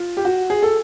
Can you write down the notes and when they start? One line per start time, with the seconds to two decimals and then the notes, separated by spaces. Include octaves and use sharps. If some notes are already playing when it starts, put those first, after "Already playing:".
Already playing: F4
0.17 G4
0.25 F#4
0.50 G#4
0.63 A4